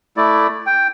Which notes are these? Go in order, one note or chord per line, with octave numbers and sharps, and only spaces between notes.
A3 E4 D5
G5